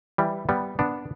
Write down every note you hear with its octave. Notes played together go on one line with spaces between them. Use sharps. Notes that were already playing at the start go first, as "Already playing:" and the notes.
E3 G3
G3 B3
B3 D4